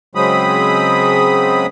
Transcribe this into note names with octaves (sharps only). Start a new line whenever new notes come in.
C#3 F#3 G#3 C4 B5 D#6